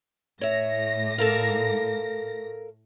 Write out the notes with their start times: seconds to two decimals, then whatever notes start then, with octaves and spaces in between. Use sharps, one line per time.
0.41 A2 C#5 E5 A#6
1.18 A4 A#4 F5